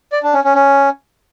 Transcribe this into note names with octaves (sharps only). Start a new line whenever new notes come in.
D5
D4
C#4
C#4
C#4